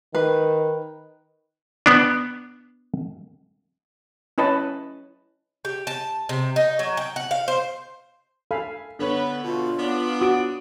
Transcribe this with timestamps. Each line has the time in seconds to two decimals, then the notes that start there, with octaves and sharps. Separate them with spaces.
0.15 D#3 B4
1.86 B3 D4
4.38 C#4 E4 B4 D#5 A5
5.65 G4
5.87 A5
6.29 C3
6.56 D#4
6.79 F#3
6.97 G5
7.16 F#5
7.31 F5
7.48 C5
8.51 A4 F5 G#5 B5
8.99 D3 B3 B4 C#5
9.44 B2 A3 F4
9.79 B3 D4
10.21 F#4 D#6 D7